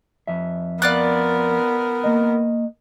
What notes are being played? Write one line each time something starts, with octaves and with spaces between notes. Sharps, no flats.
F2 E5
B3 F4 A#4 D5 F#6
A#3 D#5